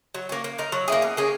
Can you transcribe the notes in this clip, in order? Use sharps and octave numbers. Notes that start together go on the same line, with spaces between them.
F#3
A#3 C#4
A#3
D#4 A#4
F#3
A#3 E4 G#4
B2
A#3 C#4 G#4